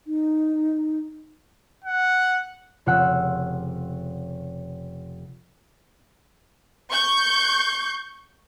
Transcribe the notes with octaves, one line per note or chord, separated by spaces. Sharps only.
D#4
F#5
F1 C#3 F4 F#5 E6 F#6
C#6 G6